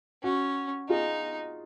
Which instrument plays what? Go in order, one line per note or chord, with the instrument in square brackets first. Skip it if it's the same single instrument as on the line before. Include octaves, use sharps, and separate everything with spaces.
[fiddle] C#4 [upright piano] F#4
[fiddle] D#4 [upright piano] F4 G#4